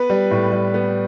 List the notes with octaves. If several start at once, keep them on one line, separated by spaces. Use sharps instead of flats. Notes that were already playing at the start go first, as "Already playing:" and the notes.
Already playing: B3 B4
G3
A2
G3
B3